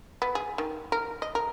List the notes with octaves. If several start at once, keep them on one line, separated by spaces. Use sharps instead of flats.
B3
G#4
D#3
A#4
D#5
A#4